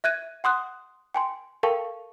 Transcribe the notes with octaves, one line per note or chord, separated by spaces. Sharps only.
E5 F#6 G#6 D#7
F#5 C6 D#6 F#6
G5 G#5 C6
A4 A#4 F5 G5 A5 C#6